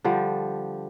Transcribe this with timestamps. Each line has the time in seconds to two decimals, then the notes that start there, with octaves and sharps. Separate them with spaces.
0.04 D3 F3 G3